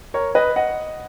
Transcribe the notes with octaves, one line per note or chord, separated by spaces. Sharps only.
A#4 C#5
B4 D#5
D#5 F#5